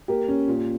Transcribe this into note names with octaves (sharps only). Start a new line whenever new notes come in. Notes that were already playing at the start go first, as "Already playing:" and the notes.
A#3 G4
C#4
A#2